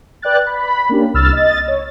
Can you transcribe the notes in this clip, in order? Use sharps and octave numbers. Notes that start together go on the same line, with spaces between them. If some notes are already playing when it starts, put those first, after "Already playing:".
B4 D5 G5 F#6 A6
B5
A#3 C#4 D4 G4
C2 E6 F6 A6
D#5 A6
C#5